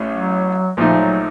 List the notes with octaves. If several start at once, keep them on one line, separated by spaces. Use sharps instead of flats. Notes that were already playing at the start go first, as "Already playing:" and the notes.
Already playing: A1 A2 A3 C#4
F#3
A#1 A#2 F3 A3 D#4
F#3